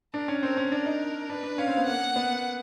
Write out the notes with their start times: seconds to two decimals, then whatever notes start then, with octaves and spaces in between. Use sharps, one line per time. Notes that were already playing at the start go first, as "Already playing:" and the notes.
0.14 D4 A#4
0.28 C#4
0.43 C4 A#4
0.57 C#4
0.72 D4 A#4
0.86 D#4
1.29 D4 B4
1.43 D4
1.58 C#4 F5
1.67 C4
1.77 B3
1.86 A#3 F#5
2.16 B3